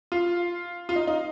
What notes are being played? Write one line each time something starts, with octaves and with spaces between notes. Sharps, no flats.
F4
F4
D#4
D#4